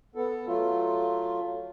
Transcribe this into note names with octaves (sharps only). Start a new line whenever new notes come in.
B3 A4
F#3 A3 F4